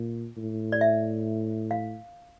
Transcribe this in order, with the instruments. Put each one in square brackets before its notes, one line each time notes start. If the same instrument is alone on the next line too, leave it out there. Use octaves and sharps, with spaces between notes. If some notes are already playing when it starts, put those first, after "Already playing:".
Already playing: [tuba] A#2
A2
[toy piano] D5
E5
F5